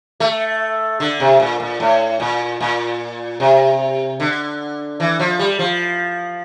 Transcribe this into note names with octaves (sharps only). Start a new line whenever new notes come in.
A3
D3
C3
A#2
A#2
A2
A#2
A#2
C3
D3
E3
F3
G3
F3